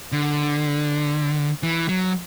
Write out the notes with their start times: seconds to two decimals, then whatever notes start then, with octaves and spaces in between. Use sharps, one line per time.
0.12 D3
1.63 E3
1.89 F#3